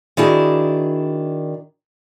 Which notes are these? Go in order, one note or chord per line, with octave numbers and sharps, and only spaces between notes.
D#3 D4 E4 F#4 G#4